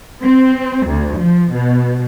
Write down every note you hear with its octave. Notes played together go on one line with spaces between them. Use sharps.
C4
D2
F3
B2